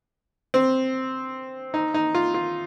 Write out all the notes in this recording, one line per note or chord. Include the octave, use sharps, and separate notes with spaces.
C4
D#4
D#4
F4
F4